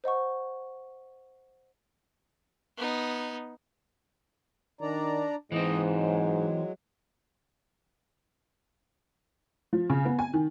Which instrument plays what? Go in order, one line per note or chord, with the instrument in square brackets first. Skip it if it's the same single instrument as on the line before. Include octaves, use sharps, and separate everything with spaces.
[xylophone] C5 D#5 F#5 C#6
[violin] B3 D#4
[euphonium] D#3 [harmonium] D4 D5 A#5
[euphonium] G#2 [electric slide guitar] E3 C4 [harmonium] D#5
[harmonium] F#3 G#3
[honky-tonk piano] F3
C#3
B3
G#5
D#3